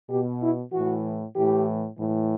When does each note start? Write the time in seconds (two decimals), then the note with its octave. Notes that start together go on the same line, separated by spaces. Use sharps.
0.09 B2 G4
0.41 E4
0.72 A2 E3 F#4
1.35 A2 E3 G4
1.97 A2 E3